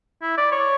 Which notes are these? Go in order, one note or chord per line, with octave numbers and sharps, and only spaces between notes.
E4
D5
C#5